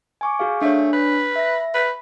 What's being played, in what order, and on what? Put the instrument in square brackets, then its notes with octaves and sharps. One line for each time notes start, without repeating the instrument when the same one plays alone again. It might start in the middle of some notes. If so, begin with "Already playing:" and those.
[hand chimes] G#5 C#6 D6
F#4 G#4 F5
[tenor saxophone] A3 [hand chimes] D4 C#5
[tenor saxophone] B4
[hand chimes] E5 A#6
[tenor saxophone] B4